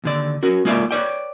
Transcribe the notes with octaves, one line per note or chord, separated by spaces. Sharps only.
D#2 D3 D5
C#4 F#4 A#4
G#3 A#3 F4 D5 E5
B4 C#5 D5 G5